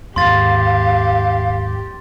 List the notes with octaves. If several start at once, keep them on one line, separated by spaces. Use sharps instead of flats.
D#2 G#2 G4 F5 C6 A6